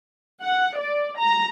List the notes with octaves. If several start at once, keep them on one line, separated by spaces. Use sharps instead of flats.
F#5
D5
A#5